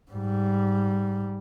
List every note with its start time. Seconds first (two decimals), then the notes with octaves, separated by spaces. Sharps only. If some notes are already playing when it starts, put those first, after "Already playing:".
0.11 G#2 G3